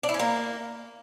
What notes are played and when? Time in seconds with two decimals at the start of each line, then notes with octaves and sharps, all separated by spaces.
0.03 D4
0.09 E4
0.14 C#4
0.19 A#3